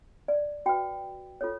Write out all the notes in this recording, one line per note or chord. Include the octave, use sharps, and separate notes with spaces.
D5
F#4 B4 G5
F4 A4 C#5